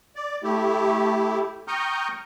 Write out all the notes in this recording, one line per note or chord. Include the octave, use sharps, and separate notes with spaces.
D5
A3 E4 G4
G5 A#5 C#6 D#6 F6 G6